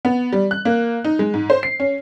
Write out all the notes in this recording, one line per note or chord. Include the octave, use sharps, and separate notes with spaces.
B3
G3
F#6
A#3
D#4
G#3
G#2
C5
C7
C#4